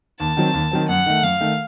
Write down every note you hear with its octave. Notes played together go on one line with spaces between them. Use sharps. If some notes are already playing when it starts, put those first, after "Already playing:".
D#2 A5
D#3 F#3 C4
D#2
D#3 F#3 C4
F#2 F#5
D#3 A3
F#2 F5
D#3 A3